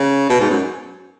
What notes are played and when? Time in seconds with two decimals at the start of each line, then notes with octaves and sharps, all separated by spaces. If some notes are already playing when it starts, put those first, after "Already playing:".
Already playing: C#3
0.29 B2
0.40 G#2
0.51 F#2